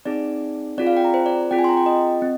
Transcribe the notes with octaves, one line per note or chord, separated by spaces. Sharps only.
C4 D#4 G#4 D5
C4 F4 G#4 D5
F5
G5
A#5
C5
D5
C4 F4 G#4 G5
G#5
C6
A#5
G5
D#5
C4